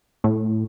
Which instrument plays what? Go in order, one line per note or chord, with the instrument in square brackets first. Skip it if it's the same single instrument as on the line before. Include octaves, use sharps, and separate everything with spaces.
[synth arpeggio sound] A2